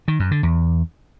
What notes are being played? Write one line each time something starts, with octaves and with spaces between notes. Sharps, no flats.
D#3
F#2
D3
E2